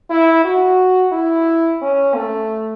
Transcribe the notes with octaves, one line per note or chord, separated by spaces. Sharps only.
E4
F#4
E4
C#4
A3